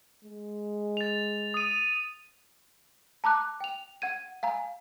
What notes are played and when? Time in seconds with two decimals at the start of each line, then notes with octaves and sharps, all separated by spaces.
0.24 G#3
0.97 A6 F7
1.54 D#6 D#7
3.24 A5 A#5 D6 F#6
3.61 G5 F7
4.02 F#5 G#6 D#7
4.43 F5 G#5 A#5